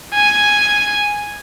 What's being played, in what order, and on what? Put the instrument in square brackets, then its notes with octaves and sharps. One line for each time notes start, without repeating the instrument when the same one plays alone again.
[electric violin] G#5